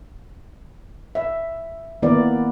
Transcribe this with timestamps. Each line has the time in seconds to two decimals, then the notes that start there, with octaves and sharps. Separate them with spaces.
1.15 E5
2.02 D#3 A#3 B3 E4 A#4 D5